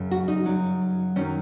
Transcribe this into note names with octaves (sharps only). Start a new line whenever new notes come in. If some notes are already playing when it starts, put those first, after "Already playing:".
Already playing: F#2 C#3 F#3
F#4
D#4
F#2 C#3 F#3
F#2 D#3 F#3 C#4